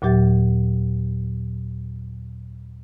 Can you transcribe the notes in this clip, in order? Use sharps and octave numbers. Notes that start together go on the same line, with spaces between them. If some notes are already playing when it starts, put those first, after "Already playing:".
D#2 A#2 F#3 G4 E5 A6